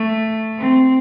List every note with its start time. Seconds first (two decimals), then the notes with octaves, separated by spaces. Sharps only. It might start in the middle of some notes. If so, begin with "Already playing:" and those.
Already playing: A3
0.58 C4